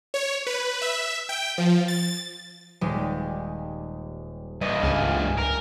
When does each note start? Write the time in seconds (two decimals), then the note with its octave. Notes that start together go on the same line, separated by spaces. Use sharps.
0.14 C#5
0.47 B4
0.82 E5
1.29 G5
1.58 F3
1.88 A6
2.81 D#1 G3 G#3
4.61 G2 E3 D#5
4.83 C#2 G#5 A5 F6
5.37 A#4